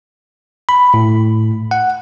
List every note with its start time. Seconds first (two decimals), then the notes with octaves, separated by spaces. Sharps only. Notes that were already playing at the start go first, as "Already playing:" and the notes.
0.69 B5
0.94 A2
1.71 F#5